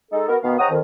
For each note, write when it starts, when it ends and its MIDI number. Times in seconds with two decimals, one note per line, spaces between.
0.11 0.27 56
0.11 0.27 63
0.11 0.27 69
0.28 0.37 59
0.28 0.37 66
0.28 0.37 70
0.43 0.55 47
0.43 0.55 51
0.43 0.55 59
0.43 0.55 77
0.59 0.67 44
0.59 0.67 73
0.59 0.67 78
0.59 0.67 79
0.59 0.67 82
0.59 0.67 87
0.70 0.79 41
0.70 0.79 51